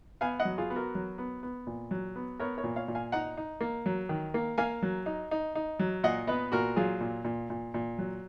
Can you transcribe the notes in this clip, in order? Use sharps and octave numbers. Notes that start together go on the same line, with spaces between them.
B3 F5 G#5
D#5 F#5
F#3
F4 G#4
B3
F#4 A#4
F#3
B3
B3
A#2
F#3
B3
B3 A#4 C#5
A#4 C#5
A#2
C#5 F5
A#2
F5 G#5
D#4 F#5 A#5
D#4
A#3
F#3
D#3
A#3
A#3 F5 G#5
F#3
D#4
D#4
D#4
F#3
A#2 D#5 F#5
B3 B4 D#5
A#2 F#4 A#4
F#3 F4 G#4
A#2
A#2
A#2
A#2
F#3